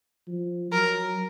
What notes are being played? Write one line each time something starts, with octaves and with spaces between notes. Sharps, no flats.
F3
F#3 A#4